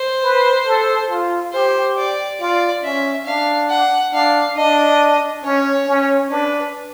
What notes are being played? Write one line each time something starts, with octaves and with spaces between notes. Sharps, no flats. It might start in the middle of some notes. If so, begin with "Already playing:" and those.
Already playing: C5
B4
A4
F4
G4 C5
D5
F4 D5
C#4 E5
D4 F5
F#5
D4 F5
D4 D#5
C#4 C#5
C#4
D4 B4